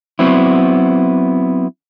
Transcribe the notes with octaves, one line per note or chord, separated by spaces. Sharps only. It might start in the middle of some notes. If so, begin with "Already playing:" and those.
F#3 B3 C4 E4